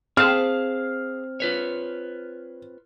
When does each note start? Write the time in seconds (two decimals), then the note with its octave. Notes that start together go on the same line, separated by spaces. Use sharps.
0.17 C4 G#4 F5 A5 F6
1.40 F4 B4 C#5